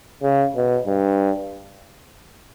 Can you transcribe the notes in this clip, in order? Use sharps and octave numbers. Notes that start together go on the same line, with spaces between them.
C#3
B2
G2